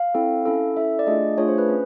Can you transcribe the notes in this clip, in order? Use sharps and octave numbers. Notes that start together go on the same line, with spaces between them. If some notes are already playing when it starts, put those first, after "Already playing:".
Already playing: F5
C4 E4 A4
C#4 E4 A4
C#4 E4 A4 E5
D5
A3 D4 F4 G#4 D#5
A3 D4 F4 G#4 C#5
C5
B4
C#4